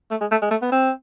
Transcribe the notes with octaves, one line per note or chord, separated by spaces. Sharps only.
A3
G#3
A3
G#3
A3
B3
C4